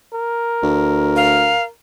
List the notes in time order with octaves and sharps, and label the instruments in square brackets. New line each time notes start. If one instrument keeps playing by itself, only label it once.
[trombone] A#4
[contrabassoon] D2
[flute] F5